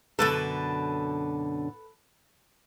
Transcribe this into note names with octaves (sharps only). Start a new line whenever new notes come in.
F#2 B2 D3 A4 B4